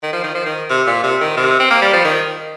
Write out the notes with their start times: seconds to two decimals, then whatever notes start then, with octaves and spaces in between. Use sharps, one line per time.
0.03 D#3
0.13 F3
0.24 D#3
0.35 F3
0.46 D#3
0.70 C3
0.87 A#2
1.04 C3
1.21 D#3
1.37 C3
1.60 C4
1.71 A#3
1.82 G3
1.93 F3
2.05 D#3